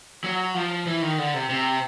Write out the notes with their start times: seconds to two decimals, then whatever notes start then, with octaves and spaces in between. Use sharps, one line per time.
0.24 F#3
0.54 F3
0.86 E3
1.02 D#3
1.18 D3
1.34 C3
1.50 C3